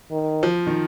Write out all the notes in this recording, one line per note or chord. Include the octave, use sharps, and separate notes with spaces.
D#3
F3
D#3